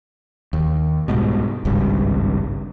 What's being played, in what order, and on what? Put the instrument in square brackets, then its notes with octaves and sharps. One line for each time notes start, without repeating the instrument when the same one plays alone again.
[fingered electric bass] D#2
C2 G#2 B2
G#1 C#2 G2